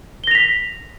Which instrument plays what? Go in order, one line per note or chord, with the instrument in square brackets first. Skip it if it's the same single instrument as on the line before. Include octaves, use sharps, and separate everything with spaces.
[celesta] G7
A#6
F7
B6